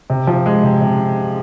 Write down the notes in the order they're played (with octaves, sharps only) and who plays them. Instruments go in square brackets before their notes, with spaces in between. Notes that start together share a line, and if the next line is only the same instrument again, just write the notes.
[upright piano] C3
F3
G#3
C3
C3